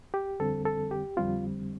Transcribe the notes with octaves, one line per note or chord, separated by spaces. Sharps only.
G4
F2 D3 G3 C4 A4
A4
G4
F2 D3 G3 C4 F4